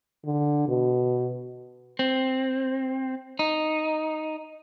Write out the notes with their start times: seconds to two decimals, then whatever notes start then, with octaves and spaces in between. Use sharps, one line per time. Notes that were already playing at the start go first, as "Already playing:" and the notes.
0.25 D3
0.68 B2
1.99 C4
3.39 D#4